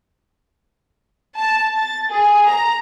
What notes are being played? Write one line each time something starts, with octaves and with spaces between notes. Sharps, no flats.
A5
A6
G#4
A#5